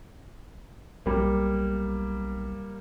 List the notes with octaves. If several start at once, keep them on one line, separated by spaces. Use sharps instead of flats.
B1 G3 A#3